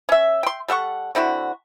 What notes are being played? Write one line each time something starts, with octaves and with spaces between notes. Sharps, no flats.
C#4 E5
G5 C6
G3 A4 F#5 C#6
D3 C4 E4 F#4